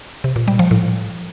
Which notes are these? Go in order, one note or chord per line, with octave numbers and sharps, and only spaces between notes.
C3
A#2
G3
F3
A2